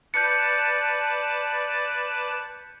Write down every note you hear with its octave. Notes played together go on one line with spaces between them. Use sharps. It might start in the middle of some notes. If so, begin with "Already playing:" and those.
B4 D5 A5 G6 C#7